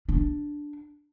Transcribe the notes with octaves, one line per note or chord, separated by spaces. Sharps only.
D4